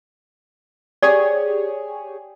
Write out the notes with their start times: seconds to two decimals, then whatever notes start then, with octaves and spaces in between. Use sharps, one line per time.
1.03 G4 G#4 C#5 D5